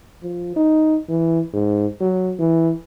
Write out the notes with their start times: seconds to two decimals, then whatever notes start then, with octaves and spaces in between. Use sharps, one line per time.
0.23 F3
0.56 D#4
1.09 E3
1.54 G#2
2.00 F#3
2.39 E3